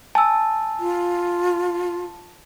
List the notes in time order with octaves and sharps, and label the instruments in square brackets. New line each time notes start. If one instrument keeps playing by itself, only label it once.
[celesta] G#5 E6 [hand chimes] A5
[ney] F4